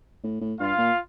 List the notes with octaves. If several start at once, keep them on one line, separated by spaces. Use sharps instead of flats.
A2
A2
G2 F4 F5
A#2